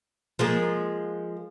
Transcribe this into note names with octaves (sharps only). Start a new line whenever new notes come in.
F3 G#3 A#3